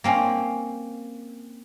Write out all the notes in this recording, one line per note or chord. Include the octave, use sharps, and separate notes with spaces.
A#3 C4 C#4